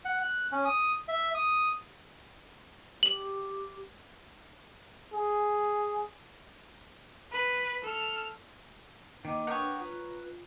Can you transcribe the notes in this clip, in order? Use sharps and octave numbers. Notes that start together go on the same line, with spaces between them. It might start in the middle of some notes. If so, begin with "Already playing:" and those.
F#5
F#6
C#4
D#6
E5
D#6
G4 F#7
G#4
B4
A4 F6
D#3 A#3 D#5 D6
D4 A#4 B4 C#5 F#5 G5 D#6
F4 B4